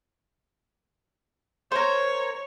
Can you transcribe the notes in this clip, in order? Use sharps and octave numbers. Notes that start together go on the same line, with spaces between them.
A#4 C5 C#5